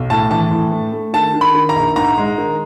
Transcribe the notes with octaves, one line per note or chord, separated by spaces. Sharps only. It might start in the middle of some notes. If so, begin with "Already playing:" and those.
Already playing: B1
A2 A5
E3 A5
A2
A3
A3
D#3 A5
D#3
B5
D#3
A#5
A#1
G#2 A#5
G#3
D#3